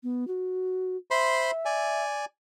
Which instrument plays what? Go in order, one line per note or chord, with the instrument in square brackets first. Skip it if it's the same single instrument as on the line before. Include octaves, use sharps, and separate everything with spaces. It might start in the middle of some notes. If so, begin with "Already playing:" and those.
[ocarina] B3
F#4
[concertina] C5 B5 C6 [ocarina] E5
[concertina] D5 G#5